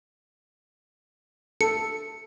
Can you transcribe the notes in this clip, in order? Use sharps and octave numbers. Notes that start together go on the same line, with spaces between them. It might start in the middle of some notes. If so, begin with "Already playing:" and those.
A4 C#7